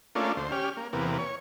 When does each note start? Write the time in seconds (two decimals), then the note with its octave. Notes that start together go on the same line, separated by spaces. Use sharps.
0.15 A3 A#3 C#4 D4 F4
0.37 D2 C5
0.52 C#4 G4 F6
0.77 A#3
0.93 E2 C3 A#3 B3
1.18 C#5